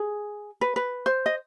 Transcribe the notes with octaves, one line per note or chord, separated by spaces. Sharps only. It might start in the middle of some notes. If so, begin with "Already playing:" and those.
Already playing: G#4
B4
B4
C5
D#5